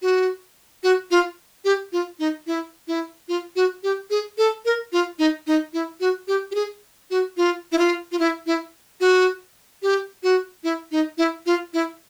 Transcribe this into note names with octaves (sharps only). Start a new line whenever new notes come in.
F#4
F#4
F4
G4
F4
D#4
E4
E4
F4
F#4
G4
G#4
A4
A#4
F4
D#4
D#4
E4
F#4
G4
G4
G#4
F#4
F4
E4
F4
F4
E4
E4
F#4
G4
F#4
E4
D#4
E4
F4
E4